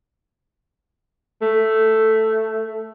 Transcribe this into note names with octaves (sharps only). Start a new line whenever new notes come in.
A3